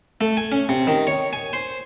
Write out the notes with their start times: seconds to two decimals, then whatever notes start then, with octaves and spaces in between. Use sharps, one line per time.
0.21 A3
0.37 G#5
0.52 C#4
0.69 C3
0.87 D#3
1.07 C#5
1.33 G#5
1.53 C5